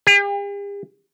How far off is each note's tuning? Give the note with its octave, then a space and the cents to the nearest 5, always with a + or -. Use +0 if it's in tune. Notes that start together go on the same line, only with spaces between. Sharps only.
G4 +45